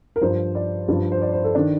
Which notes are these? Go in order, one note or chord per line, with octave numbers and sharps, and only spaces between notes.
A#4
G2 F3 C5
D5
G2 F3
C5
D5
C5
A4
D#3 D4